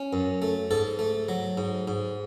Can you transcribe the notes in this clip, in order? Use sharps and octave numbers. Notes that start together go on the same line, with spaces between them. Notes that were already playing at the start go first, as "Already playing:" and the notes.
Already playing: C#4
F#2
A3
G#2 A4
A3
F#3
G#2
G#2